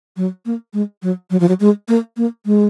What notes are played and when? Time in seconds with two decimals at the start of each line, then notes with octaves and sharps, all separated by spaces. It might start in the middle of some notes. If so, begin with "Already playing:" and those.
0.17 F#3
0.46 A#3
0.73 G#3
1.02 F#3
1.30 F#3
1.40 F3
1.48 F#3
1.60 G#3
1.88 A#3
2.17 A#3
2.45 G#3